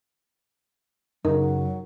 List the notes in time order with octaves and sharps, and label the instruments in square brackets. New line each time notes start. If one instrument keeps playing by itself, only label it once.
[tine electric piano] F#2 C#3 [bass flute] F#3 [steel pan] D#4 [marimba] A#4